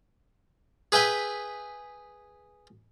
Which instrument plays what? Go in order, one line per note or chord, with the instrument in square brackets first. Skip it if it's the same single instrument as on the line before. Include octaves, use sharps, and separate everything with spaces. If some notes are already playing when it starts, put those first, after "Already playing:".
[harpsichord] G#4 B4 E5 G5 G#5